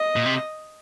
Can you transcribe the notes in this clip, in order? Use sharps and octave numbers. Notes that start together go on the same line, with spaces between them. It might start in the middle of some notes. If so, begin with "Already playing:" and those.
Already playing: D#5
A#2
C3